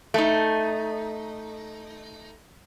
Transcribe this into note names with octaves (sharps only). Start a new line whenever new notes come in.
A3 D#4